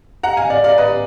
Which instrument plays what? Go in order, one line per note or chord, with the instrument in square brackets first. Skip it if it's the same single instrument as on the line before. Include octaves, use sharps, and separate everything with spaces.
[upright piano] F#5 A#5
F5 G#5
D5 F5
D5 F5
B4 D#5